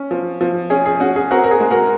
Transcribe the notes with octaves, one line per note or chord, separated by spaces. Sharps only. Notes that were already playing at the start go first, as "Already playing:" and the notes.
Already playing: C#4
F3
F3
C#4 G#4
G#4
C#4 F#4
G#4
C4 F#4 A#4
A#4
G#4
G#3
F#4 A#4